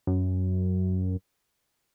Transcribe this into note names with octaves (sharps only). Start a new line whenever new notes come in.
F#2